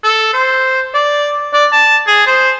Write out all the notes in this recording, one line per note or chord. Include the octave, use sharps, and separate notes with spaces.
A4
C5
D5
D5
A5
G#4
C5